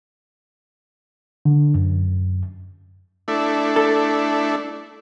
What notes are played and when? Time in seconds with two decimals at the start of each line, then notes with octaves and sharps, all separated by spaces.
1.45 D3
1.75 F#2
3.28 A3 D4 E4
3.76 A4